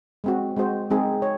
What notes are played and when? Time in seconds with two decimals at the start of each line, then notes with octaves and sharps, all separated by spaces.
0.24 G#3 C4 F#4
0.56 G#3 C4 F#4 C5
0.90 G#3 C4 D#4 G#4
1.22 C#5